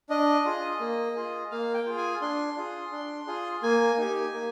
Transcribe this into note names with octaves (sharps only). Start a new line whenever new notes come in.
D4 D#5
F4 G#4
A#3
F4 G#4
A#3 F5
G5
F4 G#4
G#5
D4 C6
F4 G#4
D4
F4 G#4
A#3 G#5
D#4 G4
A#3